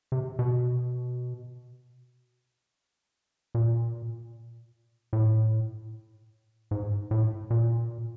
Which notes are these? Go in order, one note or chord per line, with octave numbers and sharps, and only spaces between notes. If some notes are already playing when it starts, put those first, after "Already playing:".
C3
B2
A#2
A2
G#2
A2
A#2